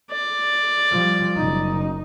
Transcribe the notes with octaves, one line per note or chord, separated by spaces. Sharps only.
D5
F3 G3
F#1 D#4